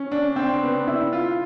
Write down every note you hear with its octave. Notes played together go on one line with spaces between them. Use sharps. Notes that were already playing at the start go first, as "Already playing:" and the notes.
Already playing: C#4
D4
C4
B3
E4
F4